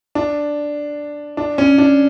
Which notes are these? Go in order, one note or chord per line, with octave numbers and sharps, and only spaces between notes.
D4
D4
C#4
D4